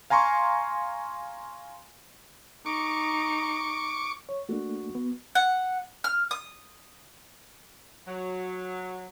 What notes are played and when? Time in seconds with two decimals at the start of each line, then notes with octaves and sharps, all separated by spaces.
0.10 F5 G#5 A#5 C6 C#6
2.66 D#4 C#6 D6
4.29 C#5
4.49 A3 A#3 D4 F#4
4.95 B3
5.35 F#5
6.04 F6
6.31 D#6
8.07 F#3